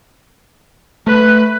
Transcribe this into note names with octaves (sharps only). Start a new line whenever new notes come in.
A3 B4